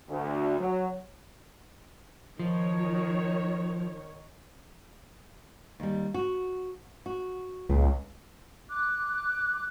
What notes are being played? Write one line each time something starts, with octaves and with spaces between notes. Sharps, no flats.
D2
F#3
D#3 F3 C#5
D#2 G3
F#4
F#4
C#2 A#2
D6 F#6